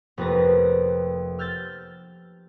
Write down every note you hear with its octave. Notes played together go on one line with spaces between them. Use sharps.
F1 F2 A#3 B4 A#6
E6 F6 G6 A6